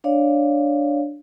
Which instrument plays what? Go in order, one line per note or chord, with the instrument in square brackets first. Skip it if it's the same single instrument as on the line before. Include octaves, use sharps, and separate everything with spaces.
[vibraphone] D4 C#5 D5 F5